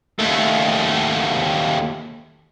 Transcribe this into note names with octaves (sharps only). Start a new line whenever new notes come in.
D#2 A3